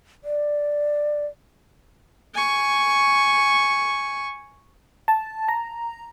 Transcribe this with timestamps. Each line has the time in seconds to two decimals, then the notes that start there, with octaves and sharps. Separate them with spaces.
0.24 D5
2.34 G#5 C#6
5.08 A5
5.48 A#5